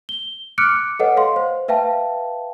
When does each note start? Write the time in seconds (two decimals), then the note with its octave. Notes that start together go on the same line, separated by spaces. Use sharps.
0.09 G7
0.58 D6 F6 F#6 C#7 D7
0.99 A4 B4 C#5 D#5 F#5
1.17 F5 C6
1.36 C5
1.68 B4 E5 F5 G5 A5